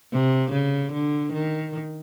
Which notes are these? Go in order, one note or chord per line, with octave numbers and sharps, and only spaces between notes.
C3
C#3
D3
D#3